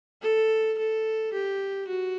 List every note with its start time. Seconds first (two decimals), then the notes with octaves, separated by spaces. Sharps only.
0.22 A4
0.78 A4
1.33 G4
1.88 F#4